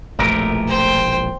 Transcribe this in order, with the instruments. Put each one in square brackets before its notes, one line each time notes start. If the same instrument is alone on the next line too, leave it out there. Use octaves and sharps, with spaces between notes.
[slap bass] E1 A#1 F2 [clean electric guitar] A3 G4 A#4
[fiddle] C5 G5